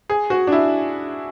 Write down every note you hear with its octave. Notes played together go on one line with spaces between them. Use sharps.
G#4
F#4
D4
E4